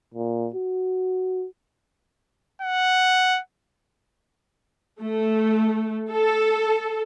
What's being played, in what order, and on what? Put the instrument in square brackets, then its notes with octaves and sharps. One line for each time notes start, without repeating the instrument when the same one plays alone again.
[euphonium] A#2
F#4
[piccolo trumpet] F#5
[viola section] A3
A4